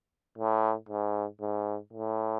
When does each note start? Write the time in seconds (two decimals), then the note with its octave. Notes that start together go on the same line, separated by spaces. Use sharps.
0.38 A2
0.89 G#2
1.41 G#2
1.93 A2